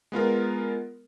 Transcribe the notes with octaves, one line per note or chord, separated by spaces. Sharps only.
G#3 B3 F4 A#4